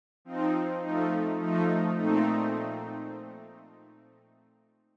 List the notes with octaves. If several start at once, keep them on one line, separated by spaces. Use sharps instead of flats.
F3 C4 D#4
F3 A3 D#4
F3 A3 D#4
A#2 A3 C4 D#4